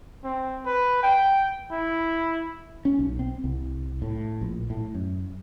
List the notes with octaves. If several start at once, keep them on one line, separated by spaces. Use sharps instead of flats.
C4
B4
G5
E4
C#4
B1
C4
C2
A2
A#1
A2
F#2